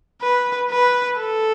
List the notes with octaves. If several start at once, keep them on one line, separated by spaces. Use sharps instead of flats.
B4
B4
A4